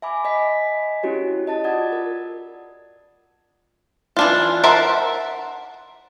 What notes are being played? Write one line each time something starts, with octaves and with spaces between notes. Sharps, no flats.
E5 G#5 B5 D6
D#5 G#5 B6
C#4 E4 F#4 G4 C#5
D#5 A5 A6
F4 D5 F#5 D#6 G#6
A#4
E3 D4 F4
A#4 C5 E5 F#5 A5